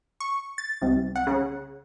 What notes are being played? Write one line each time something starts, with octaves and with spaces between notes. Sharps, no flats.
C#6
A6
C2
F#5
C#3